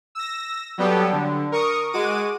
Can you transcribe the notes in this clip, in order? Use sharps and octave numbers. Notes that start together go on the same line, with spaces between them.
E6 A#6
F#3 G3 B3 G4 A4
D3
A#4 C#6 D#6
G#3 F#4 D6 D#7